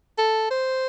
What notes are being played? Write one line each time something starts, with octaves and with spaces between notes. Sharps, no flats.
A4
C5